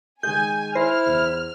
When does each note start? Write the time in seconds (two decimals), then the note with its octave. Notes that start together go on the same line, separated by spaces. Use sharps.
0.23 D#3 G#3 G#4 G#5 G6
0.75 E4 C5 F6 A#6
1.06 E2